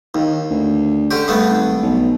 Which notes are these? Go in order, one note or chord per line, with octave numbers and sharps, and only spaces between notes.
D#2 D#3
D2
D3 C#4 G4
G2 A3 B3
G#1
B1